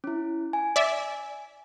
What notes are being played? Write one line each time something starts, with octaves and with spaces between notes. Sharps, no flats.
C#4 E4
G#5
D5 E5